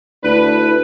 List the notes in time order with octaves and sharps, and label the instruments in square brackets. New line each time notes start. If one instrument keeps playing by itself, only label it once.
[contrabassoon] D2 [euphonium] D4 [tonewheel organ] E4 [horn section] B4